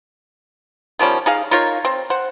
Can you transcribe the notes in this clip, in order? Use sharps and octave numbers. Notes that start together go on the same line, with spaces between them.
D#3 F3 G3 C#4
D#4 G#4 F5
D#4 F4 A#4 C#5
C4
C5 F#5